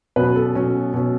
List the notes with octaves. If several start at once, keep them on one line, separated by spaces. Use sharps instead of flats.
B2 F#3 C#4 B4
A4
B2 F#3 C#4
B2 F#3 C#4